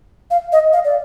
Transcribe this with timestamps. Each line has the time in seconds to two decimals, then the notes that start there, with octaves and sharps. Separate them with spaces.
0.31 F5
0.52 D#5
0.73 F5
0.85 D5